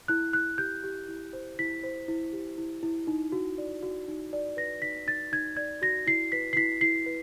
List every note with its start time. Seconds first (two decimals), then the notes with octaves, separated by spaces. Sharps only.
0.08 E4 F#6
0.33 E4 F#6
0.58 G4 G6
0.84 G4
1.08 E4
1.33 C5
1.59 E4 B6
1.83 C5
2.08 E4
2.33 G4
2.58 E4
2.83 E4
3.07 D#4
3.32 F#4
3.58 D5
3.82 F#4
4.08 D#4
4.33 D5
4.57 B4 A#6
4.82 D#4 B6
5.07 D#4 A6
5.32 D#4 G#6
5.57 D5 G#6
5.82 F#4 A#6
6.07 E4 C7
6.32 B4 B6
6.53 C7
6.56 E4 B6
6.81 E4 C7
7.06 B4